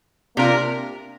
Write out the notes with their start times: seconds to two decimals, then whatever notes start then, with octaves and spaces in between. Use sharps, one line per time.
0.36 C3 A#3 D4 F4 A#4